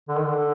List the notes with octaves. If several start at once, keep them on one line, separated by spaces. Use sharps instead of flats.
D3
D#3
D3